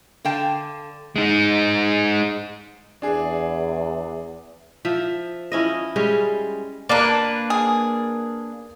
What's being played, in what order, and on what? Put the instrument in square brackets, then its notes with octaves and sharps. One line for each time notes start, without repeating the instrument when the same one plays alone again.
[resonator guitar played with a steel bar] D3 F5 G5 A5
[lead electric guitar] G#3 D#4
[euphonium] E2 [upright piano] D4 G#4
[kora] F3 E5
F3 C#4 E4 D#5
G3 G#3 C#4
[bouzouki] A#3 D4 B4 [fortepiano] D5 A5 A#5
[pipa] G#4